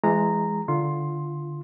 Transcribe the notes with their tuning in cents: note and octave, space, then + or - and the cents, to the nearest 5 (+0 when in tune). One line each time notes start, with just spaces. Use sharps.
E3 +30 G#3 +0 A#5 -10
D3 -5 F4 -20 C6 +10